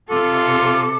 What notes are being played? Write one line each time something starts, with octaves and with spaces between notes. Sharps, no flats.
C3 F4 A4 D6